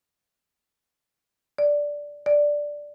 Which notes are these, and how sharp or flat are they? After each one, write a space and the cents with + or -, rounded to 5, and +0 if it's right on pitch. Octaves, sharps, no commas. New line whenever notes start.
D5 -5
D5 +0